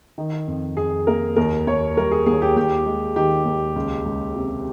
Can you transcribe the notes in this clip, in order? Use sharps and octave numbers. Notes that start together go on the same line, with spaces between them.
D#3
F2
F2 G#4
A#3 A#4
D#2 A#4
D#2 C#5
G3 A#4
G#4
D#2 G#4
G4
D#2 G4
G#3
D#3 G4
D#2
C#2
C#2
C3